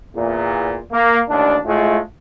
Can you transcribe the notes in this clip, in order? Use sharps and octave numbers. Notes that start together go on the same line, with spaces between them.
E2 A#2
A#3
A1 D#2 D4
A2 G#3 A3 F4